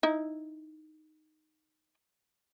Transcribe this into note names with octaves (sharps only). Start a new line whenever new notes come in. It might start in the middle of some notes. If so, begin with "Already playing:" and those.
D#4 E4